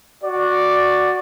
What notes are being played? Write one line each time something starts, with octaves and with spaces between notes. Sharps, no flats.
F#4 D5